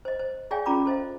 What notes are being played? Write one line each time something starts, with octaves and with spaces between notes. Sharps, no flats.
C5 D#5
C5
G#4 C#5 D5 F5 G5 G#5
C#4 F4 A#5 B5 D6
A4 C5 D#5 F5